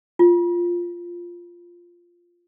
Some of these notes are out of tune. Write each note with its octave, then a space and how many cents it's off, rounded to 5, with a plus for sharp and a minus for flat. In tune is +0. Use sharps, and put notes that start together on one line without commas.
F4 +0